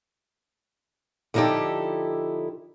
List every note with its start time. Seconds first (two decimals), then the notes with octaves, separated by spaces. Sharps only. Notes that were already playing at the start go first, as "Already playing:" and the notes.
1.34 D3 F3 D#4 E4 G4 A4